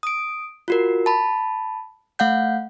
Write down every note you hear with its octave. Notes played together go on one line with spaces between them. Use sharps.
D#6 D7
F4 F#4 A#4
A5 B5
A3 F5 F#5 G6